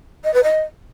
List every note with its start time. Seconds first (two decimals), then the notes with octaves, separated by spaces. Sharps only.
0.24 D#5
0.33 B4
0.43 D#5